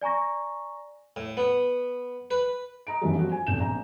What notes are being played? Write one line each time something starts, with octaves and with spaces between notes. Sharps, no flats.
D5 G#5 A#5 C#6 A#6
A2
B3
B4
D#5 A#5 D7
F#2 B2 D#3 E3 F#3 G3
F3 F#4
G#5
F1 B1 G6 E7
A#1 A#5